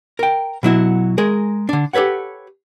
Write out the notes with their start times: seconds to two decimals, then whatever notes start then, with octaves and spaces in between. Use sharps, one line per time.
0.19 A#4 G5
0.63 B2 F#3 E4 F#4
1.18 G#3 G#4 A#4
1.69 D3 D4
1.93 G4 A4 B4 C#5 F#5